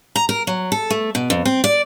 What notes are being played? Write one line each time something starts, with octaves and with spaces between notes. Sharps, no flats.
A#5
A#4
F#3
A4
A3
B2
F2
C4
D5